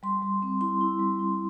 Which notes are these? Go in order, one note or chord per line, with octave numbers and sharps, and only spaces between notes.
G3 C6
G3
C4
E4 C6
E4
G3
E4